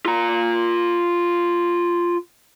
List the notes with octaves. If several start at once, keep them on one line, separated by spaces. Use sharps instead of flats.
F4 A#5